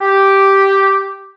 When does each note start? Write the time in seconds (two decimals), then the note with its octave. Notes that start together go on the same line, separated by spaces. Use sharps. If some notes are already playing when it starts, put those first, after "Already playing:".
0.01 G4